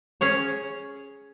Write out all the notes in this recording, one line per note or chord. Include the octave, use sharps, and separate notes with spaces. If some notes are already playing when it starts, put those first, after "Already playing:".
C#4 G#4 C#5